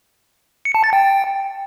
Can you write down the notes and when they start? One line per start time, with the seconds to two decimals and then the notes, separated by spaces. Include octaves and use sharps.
0.65 C#7
0.75 A5
0.84 A6
0.93 G5